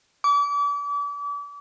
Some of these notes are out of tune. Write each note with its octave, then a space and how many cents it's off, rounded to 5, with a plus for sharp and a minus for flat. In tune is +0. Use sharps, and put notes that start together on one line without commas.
D6 -35